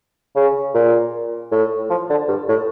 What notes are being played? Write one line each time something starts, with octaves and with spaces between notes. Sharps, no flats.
C#3
A#2
A2
F3
D3
G2
A2